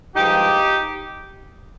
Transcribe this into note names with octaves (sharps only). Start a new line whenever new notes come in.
G2 F3 G#3 D#4 G4